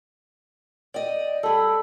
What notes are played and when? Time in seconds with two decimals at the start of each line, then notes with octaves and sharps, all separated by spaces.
0.94 D5 D#5 G5
1.43 G3 G#4 A4 B5